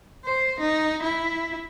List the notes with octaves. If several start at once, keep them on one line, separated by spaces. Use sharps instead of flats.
C5
D#4
E4